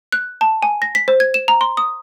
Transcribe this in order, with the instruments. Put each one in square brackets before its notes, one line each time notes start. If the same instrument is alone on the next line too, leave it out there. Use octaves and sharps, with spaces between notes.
[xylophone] F#6
A5
G#5
A#6
B6
C5
G#6
E7
A#5
C6
D#6